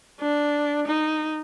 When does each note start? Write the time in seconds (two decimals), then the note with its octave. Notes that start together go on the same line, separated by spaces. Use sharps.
0.21 D4
0.87 D#4